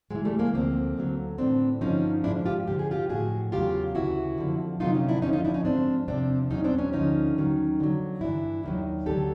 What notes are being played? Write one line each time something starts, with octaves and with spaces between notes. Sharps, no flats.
G#2 E3 F#3 G#3
G3 A3
G#3 A#3
D2 D3 F3 A#3 C4
D2 D3 F#3
A2 E3 C4 D4
G2 D3 F3 C#4 D#4
G#2 F3 D4 E4
F4 G4
G2 D3 F3 G4
G#4
F4 G4
A2 F3 F#4 G#4
E2 C#3 F#3 F4 G4
D2 C#3 E3 E4 F#4
F2 D3 F3
F2 C3 D#3 F#3 D#4 F4
C#4 D#4
D4 E4
F2 D3 F3 C#4 D#4
D#4 F4
D4 E4
C#4 D#4
G#2 F3 C4 D4
E2 C3 F3 C4 D4
E2 B2 F#3 C#4 D#4
C4 D4
B3 C#4
D2 D3 F3 C#4 D#4
D#2 D#3 F#3
F2 D3 F#3
G2 E3 D4 E4
D#2 D#3 F#3
D2 D3 F#3 G4 A4